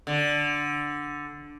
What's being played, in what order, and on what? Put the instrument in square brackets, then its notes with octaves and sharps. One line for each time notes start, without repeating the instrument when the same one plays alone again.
[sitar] D3